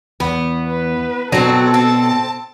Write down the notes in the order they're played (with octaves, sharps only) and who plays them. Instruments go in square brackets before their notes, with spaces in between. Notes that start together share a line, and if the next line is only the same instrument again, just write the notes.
[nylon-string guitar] E2 [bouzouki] B3
[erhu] B4
[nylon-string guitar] B2 B3 D4 [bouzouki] F#3 C4 [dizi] F#4 [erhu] A4
[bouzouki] C4 [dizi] A5